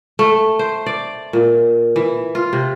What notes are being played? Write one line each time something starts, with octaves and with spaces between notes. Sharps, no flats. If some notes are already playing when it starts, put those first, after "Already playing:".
A3
C5
D5
A#2
E3
F4
C3